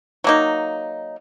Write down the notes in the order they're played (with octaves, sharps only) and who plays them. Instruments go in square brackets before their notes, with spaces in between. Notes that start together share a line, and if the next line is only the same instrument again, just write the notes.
[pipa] F#3 A#3 D#4